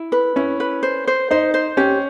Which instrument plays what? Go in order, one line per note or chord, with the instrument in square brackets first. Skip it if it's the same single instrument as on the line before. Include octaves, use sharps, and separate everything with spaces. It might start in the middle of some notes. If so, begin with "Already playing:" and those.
Already playing: [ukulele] E4
B4
[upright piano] C#4 [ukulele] E4
[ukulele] B4
C5
C5
[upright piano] D#4 [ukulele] C5
[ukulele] C5
[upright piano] C#4 [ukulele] G4